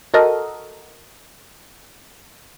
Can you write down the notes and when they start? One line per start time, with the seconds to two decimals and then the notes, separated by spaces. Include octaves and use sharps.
0.14 F#4 A4 A#4 D#5